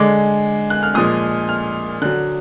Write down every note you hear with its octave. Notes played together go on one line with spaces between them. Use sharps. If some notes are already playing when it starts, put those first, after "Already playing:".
Already playing: D3 G#3 D6
F#6
F6
A#2 F3 G#3 D#6
F6
D3 F#3 F#6